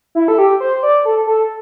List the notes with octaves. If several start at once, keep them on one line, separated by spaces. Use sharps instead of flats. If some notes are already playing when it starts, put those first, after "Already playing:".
E4
A4
G4
C5
D5
A4
A4